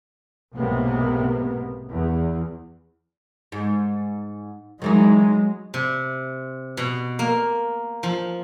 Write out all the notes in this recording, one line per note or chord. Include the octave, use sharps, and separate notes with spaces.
B1 G#2 C3 A#3 B3
E2
G#2
D#3 E3 F#3 G#3 D#4
C3
B2
A#3
F3